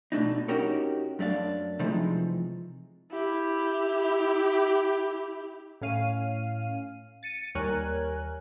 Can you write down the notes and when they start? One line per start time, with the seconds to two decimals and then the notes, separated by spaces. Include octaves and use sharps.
0.12 B2 A3 D4 D#4
0.48 C#4 D#4 F#4 G4 A#4 C#5
1.19 F#2 A3 D4 F5
1.79 C3 E3 F3 G#3 A3 D#4
3.11 E4 G4
5.81 A2 C#4 F5 D#7
7.23 A6 C#7 D#7
7.55 D#2 G3 A#4 C#5 G#5 F#6